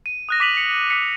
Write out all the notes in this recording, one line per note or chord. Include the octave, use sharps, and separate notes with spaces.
D#7
D#6 F#6 A#6
D6 A#6 B6 D#7 F7 F#7
C#7 F7
D#6 E6 B6 C#7